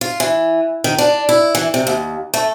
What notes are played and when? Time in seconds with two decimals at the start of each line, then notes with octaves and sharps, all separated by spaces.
0.01 F4
0.20 E3
0.84 D#3
0.98 D4
1.29 E4
1.55 E3
1.74 C3
1.87 D#2
2.34 A3